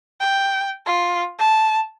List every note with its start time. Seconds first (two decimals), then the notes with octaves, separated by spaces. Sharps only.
0.20 G5
0.86 F4
1.39 A5